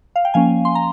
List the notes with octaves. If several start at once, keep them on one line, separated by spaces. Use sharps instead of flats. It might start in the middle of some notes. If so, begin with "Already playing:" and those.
F5
G5
F3 A#3 C#4 F5 G#5
C6
A#5